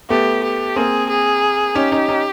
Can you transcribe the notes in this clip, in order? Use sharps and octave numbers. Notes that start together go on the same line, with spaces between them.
A3 B3 G4
G4
A#3 C4 G#4
G#4
C#4 D#4 G4
C#4 D#4
C#4 D#4